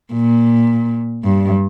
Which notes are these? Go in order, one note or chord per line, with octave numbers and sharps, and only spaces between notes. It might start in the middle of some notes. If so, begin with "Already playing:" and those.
A#2
G2